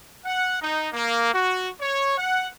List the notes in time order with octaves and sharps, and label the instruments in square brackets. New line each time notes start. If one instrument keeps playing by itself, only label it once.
[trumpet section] F#5
D#4
A#3
F#4
C#5
F#5